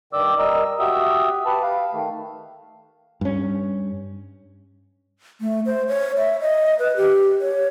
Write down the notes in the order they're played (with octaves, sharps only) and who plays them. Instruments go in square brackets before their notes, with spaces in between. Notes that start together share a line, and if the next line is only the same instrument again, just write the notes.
[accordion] G2 D#3 D5 D6 E6
G3 A#4 D#5 E6
F#4 G4 E5 D#6 E6
G4 B4 A5
F5
D#3 A3
[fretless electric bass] G2 C#4
[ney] A3
C5
C#5
E5
D#5
B4
G4
C#5